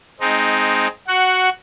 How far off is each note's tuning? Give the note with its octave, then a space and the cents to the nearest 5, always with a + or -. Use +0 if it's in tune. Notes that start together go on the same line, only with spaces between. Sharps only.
G#3 +15 C4 +0 D#4 +0
F#4 +0 F#5 +10